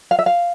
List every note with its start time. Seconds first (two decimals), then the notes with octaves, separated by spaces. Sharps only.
0.11 F5
0.19 E5
0.26 F5